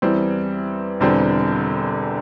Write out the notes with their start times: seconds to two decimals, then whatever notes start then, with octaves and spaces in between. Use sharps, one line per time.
0.02 E2 E3 G3 C4
1.00 E1 E2 D3 G3 C4